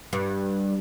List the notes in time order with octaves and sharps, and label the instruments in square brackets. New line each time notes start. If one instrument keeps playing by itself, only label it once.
[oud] G2